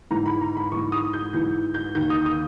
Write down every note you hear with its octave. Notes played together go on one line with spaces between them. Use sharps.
G#2 E3 A#5
B5
A#5
B5
G#2 E3 C#6
D#6
G6
G#2 E3 G6
G6
D#2 D#3 G6
D#6
D#6